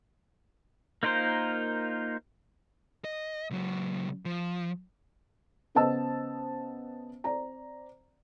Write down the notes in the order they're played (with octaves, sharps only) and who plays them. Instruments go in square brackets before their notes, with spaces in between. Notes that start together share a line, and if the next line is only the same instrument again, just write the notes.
[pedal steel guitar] A#3 D#4 F4 A#4 C5
[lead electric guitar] D#5
C#2 F#3
F3
[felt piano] C#3 B3 C5 D#5 A5 E6
C4 D5 A#5